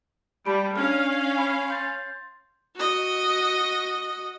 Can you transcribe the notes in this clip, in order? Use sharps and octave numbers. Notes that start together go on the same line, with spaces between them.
G3 A5 B5 D7
C#4 D4 F5 F6
G#5 B5
C6 G6 A6
F#4 D#5